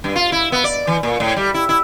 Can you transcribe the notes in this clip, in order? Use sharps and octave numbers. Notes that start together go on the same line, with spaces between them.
G2
F4
E4
B3
D5
E3
A#2
A2
G3
E4
E4